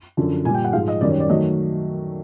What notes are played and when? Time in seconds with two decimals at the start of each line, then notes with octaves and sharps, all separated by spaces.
0.17 F#2 D3 F3
0.45 A#2 G#5
0.48 G3
0.54 G5
0.64 F#5
0.73 G#2 F3 G#3 F5
0.88 D#5
1.01 F#2 D#3 G3 D5
1.10 C#5
1.20 D5
1.29 D#3 F#3 A3 D#5